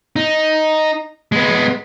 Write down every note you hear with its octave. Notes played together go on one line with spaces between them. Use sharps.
D#4
G#3 B3